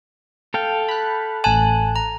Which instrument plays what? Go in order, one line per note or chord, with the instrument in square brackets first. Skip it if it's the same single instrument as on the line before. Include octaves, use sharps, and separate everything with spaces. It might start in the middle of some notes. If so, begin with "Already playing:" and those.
[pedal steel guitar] A4 F5 G5
[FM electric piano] B5 F#6
[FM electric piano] A1 F#6 [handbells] G#5 A5
[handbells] A#5